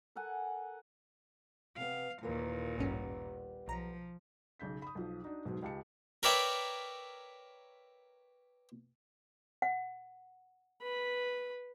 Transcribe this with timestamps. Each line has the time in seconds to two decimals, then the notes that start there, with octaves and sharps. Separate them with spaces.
0.16 A4 A#4 F#5 G#5
1.77 C3 B3 F5
2.23 D#2 A#2 E3 A#3
2.78 A1 G2 G3 B3 C#4
3.68 B1 F3 A#5
4.60 B1 C#3 G6 B6
4.82 B5 D#6
4.95 B1 F3
5.23 D4 D#4 F#4
5.45 B1 G#2 B2 F#3
5.62 C#2 G4 A5 C#7
6.23 A#4 B4 C#5 D5 E5 G5
9.62 F#5
10.82 B4 B5